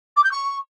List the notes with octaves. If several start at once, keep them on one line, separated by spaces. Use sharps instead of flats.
D6
G6
C#6